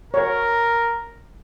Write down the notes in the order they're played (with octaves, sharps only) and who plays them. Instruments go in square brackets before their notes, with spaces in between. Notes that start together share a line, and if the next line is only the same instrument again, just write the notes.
[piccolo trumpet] A#4 [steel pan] C#5